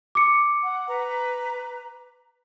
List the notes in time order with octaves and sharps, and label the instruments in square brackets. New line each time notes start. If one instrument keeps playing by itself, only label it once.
[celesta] D6 C#7
[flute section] F#5
B4 A#5